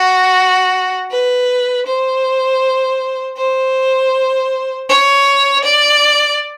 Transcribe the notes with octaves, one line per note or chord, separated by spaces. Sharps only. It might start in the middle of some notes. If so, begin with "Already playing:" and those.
Already playing: F#4
B4
C5
C5
C#5
D5